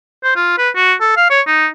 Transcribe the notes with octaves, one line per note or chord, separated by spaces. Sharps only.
C5
F4
B4
F#4
A4
F5
C#5
D#4